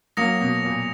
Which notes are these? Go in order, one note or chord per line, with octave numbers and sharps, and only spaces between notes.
F#3 A#3 D#6 A#6 C#7 F7
B2
A#2